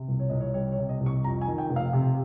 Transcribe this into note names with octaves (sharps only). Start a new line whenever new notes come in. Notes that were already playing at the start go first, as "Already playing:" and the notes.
Already playing: C3
C2
C#5
C2 D#5
C#5
G3 C#5
C#5
C3
D#5
C2
C#6
F2 A#5
G#5
D#3
G5
F1
F5
C3